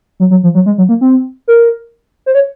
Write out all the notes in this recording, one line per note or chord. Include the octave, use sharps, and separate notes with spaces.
F#3
F#3
F3
F#3
G#3
F#3
A#3
C4
A#4
C5
C#5